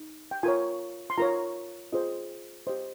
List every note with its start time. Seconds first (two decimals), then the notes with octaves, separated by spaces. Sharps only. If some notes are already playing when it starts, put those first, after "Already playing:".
Already playing: D#4
0.31 G5
0.43 F4 A#4 C#5 G#5
1.10 C6
1.18 F4 A#4 C#5 A#5
1.92 F4 G#4 C5 D#5
2.67 G4 C5 D#5